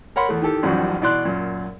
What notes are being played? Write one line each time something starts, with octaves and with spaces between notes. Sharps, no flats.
A#4 C#5 F#5 B5 C6
E2 A3
D#3 E3 G4 A4
A1 F#2 D#3 F3 G3 F#4
B2 E3 D5 C6 F#6
F#2 A#2